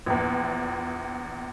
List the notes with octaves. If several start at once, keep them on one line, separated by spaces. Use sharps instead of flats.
A#1 E2